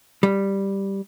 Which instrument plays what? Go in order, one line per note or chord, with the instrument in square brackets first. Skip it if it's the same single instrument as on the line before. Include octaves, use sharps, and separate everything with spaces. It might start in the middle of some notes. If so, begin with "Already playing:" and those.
[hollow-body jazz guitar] G3